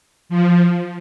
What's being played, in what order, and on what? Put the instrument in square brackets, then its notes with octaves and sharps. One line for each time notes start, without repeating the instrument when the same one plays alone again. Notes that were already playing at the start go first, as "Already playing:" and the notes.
[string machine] F3